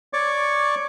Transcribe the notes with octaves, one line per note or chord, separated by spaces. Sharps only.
C#5 D5 C#6 D6